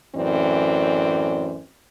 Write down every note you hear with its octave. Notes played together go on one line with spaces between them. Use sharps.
F#2 A2 E3 C4 D5